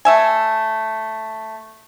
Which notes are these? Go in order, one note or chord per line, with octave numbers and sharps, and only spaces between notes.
A3 E5 G#5